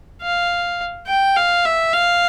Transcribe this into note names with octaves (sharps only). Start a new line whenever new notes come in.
F5
G5
F5
E5
F5